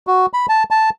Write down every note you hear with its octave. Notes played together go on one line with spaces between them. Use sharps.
F#4
B5
A5
A5